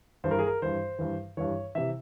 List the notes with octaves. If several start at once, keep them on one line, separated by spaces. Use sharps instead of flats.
G2 E3 C5
A#4
G#4
A#4
G2 E3 C5
G2 E3
G2 E3 C#5
C3 E3 E5